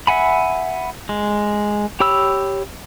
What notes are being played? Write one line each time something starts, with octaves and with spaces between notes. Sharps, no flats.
E5 F#5 G#5 B5
G#3
G4 C#5 B5 E6